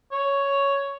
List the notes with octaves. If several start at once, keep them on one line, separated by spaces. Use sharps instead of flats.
C#5